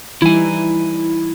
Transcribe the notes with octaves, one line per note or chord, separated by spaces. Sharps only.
E3 G3 D#4 E4 G#5